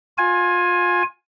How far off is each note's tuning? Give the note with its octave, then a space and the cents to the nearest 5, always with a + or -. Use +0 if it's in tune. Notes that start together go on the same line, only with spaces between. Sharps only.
F4 +25 G#5 +0